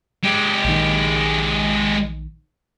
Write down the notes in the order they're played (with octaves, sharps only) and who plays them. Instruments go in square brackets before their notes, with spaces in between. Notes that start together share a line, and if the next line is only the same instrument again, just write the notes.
[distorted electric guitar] G#3 G4
[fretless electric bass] A#1 D#3